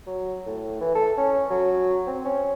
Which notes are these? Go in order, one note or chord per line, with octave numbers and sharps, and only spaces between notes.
F#3
A2
E3
A4
C#4
F#3
C4
C#4